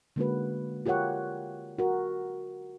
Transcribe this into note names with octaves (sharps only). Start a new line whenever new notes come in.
D3 G#3 A#3 C#4 F#4 B4
F4 G4 A#4 C#5 F#5
F#4 A#4